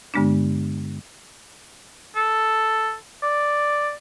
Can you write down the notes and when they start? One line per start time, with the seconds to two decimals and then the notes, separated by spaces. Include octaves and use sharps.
0.14 G2 D3 G#3 B3 D4
2.15 A4
3.23 D5